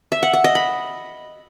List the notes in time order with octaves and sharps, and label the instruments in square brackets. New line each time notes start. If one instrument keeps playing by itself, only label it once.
[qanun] E5
F#5
F#5
D#5
B5